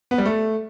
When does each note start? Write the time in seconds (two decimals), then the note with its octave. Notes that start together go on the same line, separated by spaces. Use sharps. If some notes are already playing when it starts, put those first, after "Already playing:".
0.11 B3
0.18 G3
0.26 A3